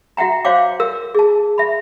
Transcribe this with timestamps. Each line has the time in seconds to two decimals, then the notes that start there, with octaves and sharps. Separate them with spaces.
0.17 F#4 E5 F#5 G5 A#5
0.45 F#4 C5 C#5 F5 G5 D6
0.80 A#4 E6
1.15 G#4 A5
1.58 E5 B5